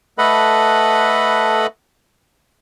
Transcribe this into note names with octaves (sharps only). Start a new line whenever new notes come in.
A3 A4 B4 D#5 F#5 B5